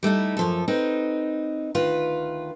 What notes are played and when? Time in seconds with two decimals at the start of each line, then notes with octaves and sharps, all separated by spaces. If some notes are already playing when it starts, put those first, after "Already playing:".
0.03 G3 A3 D#4 E4
0.37 F#2 F3 A4
0.68 C4 D#4 B4
1.75 D2 D#3 F4 B4